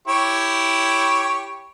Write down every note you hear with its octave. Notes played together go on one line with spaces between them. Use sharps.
E4 G4 C#5